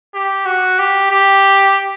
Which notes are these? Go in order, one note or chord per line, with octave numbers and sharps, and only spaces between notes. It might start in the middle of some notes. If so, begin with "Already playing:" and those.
G4
F#4
G4
G4